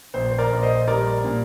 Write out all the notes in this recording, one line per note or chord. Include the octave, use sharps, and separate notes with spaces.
A#1 C5
C5
A#4 D5
A#1
C5 D#5
G3 A#4 D5
A#2